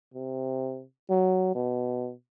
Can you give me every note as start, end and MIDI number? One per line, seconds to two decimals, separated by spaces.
0.14 0.83 48
1.10 1.51 54
1.55 2.12 47